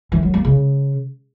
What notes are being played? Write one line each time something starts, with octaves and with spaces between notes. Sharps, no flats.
E3
F#3
A#3
C#3